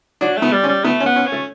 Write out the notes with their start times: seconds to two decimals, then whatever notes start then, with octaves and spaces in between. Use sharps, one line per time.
0.21 F#3 D4
0.37 A3
0.42 B3
0.52 G3
0.64 C#4
0.69 G3
0.84 A3 B3
1.00 C#4
1.06 B3
1.16 C#4
1.26 C#4
1.32 A3